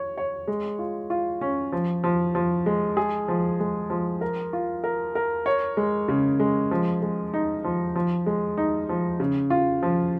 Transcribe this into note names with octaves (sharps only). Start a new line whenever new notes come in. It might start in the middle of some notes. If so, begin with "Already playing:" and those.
Already playing: C#5
C#5
G#3
F4
F4
C#4
F3
F3
F3
G#3
G#4
F3
G#3
F3
A#4
F4
A#4
A#4
C#5
G#3
C#3
G#3
F3
G#3
D#4
F3
F3
G#3
D#4
F3
C#3
F4
F3